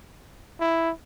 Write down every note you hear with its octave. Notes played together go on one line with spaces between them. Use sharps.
E4